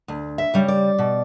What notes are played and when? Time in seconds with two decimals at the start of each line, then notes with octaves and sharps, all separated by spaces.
0.08 D2
0.38 E5
0.54 C#3 G3
0.68 D5
0.99 B2